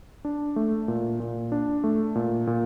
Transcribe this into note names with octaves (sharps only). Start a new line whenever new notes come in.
D4
A3
A#2
A#2
D4
A3
A#2
A#2